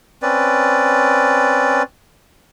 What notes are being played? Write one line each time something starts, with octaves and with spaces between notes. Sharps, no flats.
C4 C#4 B4 D5